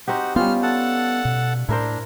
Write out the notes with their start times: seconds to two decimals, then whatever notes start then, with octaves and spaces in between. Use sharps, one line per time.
0.08 C4 D#4 F#4 G4 F#5
0.36 G3 B3 C#4 F4 F6
0.63 A4 F#5 A5
1.25 B2
1.69 A2 D4 E4 A#4 C5